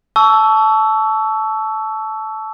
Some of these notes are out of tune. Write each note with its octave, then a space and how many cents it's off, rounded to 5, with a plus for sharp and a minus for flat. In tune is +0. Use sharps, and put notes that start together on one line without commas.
A5 -15 C#6 +30 E6 +0